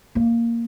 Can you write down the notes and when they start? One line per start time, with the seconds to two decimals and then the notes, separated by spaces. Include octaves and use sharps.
0.15 A#3